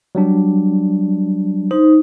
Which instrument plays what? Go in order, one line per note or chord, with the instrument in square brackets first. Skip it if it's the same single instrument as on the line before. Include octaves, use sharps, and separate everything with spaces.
[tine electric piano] F#3 G3 D4
[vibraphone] D#4 [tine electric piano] C5